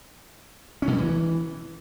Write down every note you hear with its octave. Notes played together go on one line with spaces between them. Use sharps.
C#4
B2
G3
E3